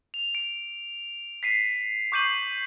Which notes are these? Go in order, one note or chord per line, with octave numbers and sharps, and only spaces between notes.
F7
D7
B6 C7 D#7
C#6 D6 G6 C7 D#7 F#7